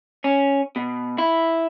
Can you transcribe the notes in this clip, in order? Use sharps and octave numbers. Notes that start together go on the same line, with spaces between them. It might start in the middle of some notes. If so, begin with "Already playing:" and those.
C#4
B2
E4